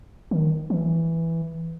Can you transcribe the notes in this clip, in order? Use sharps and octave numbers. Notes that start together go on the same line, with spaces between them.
D#3
E3